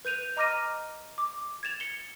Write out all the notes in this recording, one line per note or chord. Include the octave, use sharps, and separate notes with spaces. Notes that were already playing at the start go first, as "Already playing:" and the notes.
B4 G6 D#7 F7
D#5 A#5 D6 F6 A#6 D#7
D6
G#6 A6 E7 F7
C#7 G7